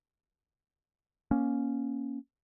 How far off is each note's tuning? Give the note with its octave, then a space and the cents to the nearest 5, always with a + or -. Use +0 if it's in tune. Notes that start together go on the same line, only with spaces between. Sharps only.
A#3 +25 C#4 +5